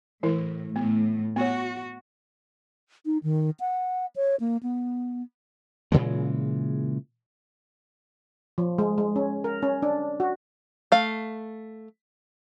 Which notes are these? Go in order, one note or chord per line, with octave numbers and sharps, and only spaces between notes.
A2 E3 E4 A#4
A2 B3
B3 F#4 C#5
D#4
D#3
F#5
C#5
A#3
B3
A#2 C#3 E3 G#3
F3
G#3
G#3
C#4
A#4
C#4
D4
F#4
A3 F5